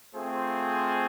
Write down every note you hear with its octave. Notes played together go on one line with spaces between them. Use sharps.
A3 C4 F4 G#4 C5